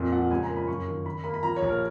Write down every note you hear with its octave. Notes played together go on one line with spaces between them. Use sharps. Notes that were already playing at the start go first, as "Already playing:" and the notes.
Already playing: F2 A#2
F3 F#5
C#2 G#5
A#5
A#3
B5
F#2 C#6
D#3
D#3 B5
A#3 B5
B5
F3 A#5
C#5
A#1
A#4